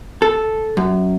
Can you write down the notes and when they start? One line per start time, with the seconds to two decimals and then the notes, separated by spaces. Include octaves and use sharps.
0.22 A4
0.77 F#2